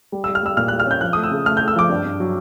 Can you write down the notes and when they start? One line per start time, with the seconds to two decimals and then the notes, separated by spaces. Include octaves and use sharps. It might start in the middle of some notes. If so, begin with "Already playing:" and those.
0.12 G3
0.24 G3 E6
0.35 F6
0.43 G3 E6
0.57 A#2 F6
0.68 G3 F#6
0.80 F6
0.86 C#4 G6
1.01 F3 F#6
1.13 A3 D#6
1.24 E6
1.31 C#3
1.46 A3 F6
1.57 A3 G6
1.68 E6
1.76 F3 D6
1.89 G2
2.05 G2
2.20 F#3